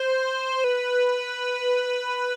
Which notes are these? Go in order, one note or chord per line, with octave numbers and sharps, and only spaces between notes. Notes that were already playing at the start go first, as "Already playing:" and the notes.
Already playing: C5
B4